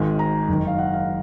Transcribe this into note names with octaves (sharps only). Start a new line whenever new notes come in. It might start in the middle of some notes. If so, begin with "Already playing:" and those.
Already playing: G#1 G#2 D#3 G#5
A#5
F#1 F#2 D#3
F5
F#5
F5